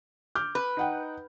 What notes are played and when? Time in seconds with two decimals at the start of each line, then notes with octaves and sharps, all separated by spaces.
0.35 D6 F6 G6
0.55 B4
0.77 D#4 F#5 G5